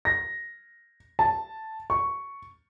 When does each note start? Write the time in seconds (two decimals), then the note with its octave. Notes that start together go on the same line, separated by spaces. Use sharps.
0.05 A#6
1.19 A5
1.90 C#6